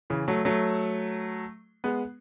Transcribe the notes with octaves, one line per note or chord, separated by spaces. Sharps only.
C#3 E3
F#3 A3
F#3 A3
G#3 B3